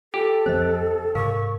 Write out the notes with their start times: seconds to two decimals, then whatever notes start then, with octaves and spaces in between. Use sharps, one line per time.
0.14 F4 G4 A4 G5
0.46 F2 F3 C4 C5 D#5
1.15 G#2 C3 G#4 A#4 F5 C#6